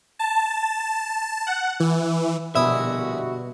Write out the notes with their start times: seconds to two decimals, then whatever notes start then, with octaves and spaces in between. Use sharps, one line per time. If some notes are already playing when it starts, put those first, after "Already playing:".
0.19 A5
1.47 F#5
1.80 E3
2.55 A#1 B2 D3 G3 E4 F#4 E5 D#6